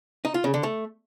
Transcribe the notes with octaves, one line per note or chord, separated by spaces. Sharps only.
D#4
F4
C#3
D3
A3